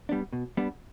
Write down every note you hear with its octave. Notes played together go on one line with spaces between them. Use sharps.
G3 B3 D4
B2
G3 B3 D4